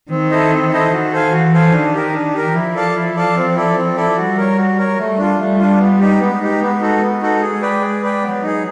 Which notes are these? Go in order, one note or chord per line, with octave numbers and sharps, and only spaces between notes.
D#3 C4
E4 A4 C5 D#5
C4
E4 A4 C5 D#5
D#3 F#4
A4 C5 F5 G#5
E3 F#4
A4 C5 F5 G#5
D#3 D4
G4 A#4
D4
G4 A#4
F3 E4
A4 D5 F5 A5
E4
A4 D5 F5 A5
C4
E4 A4 D5
C4
E4 A4 D5
G3 F#4
A#4 C#5
F#4
A#4 C#5
G3 A3
D4 F4
G3 A3
D4 F4
B3
D#4 G4
G#3 B3
D#4 G4
B3
D#4 F#4 A4
G#3 B3
D#4 F#4 A4
G#4
B4 D5 G5
G#4
B4 D5 G5
F#3 B3
D#4 G#4